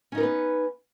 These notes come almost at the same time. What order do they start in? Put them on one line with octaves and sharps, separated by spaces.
C#4 D#4 A#4 B4 B3